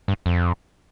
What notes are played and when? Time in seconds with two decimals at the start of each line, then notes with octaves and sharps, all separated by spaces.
0.08 G2
0.26 F2